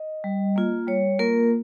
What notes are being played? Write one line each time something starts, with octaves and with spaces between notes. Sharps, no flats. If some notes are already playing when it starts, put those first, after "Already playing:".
Already playing: D#5
G3
A#3 F4
G3 C#5
A#3 F4 A#4